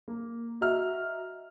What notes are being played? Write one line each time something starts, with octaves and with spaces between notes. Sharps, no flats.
A#3
F#4 D#5 E5 A#5 F6